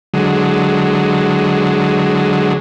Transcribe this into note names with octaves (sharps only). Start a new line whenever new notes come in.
D3 F#3 G#3